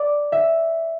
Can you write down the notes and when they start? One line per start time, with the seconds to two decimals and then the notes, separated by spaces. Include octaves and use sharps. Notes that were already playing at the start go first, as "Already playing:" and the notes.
Already playing: D5 D6
0.32 E5